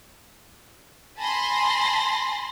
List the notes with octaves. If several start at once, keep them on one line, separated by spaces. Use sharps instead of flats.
G#5 A5 B5 C6 A#6